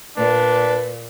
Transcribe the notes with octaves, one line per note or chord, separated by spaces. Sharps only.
A#2 D4 B4